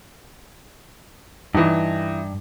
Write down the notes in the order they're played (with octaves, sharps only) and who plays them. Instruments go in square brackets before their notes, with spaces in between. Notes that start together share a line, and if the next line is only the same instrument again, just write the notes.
[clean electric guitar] G2 [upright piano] E3 D#4